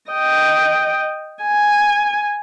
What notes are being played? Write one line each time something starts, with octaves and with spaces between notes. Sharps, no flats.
D#5 G5
G#5